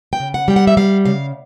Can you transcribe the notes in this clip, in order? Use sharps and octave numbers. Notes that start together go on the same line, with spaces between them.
G5
C#3
F#5
G3 G5
F#5
E5
G3 F5
C#3 F5